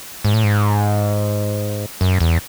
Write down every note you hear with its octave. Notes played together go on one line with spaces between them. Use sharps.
G#2
A2
G#2
F#2
E2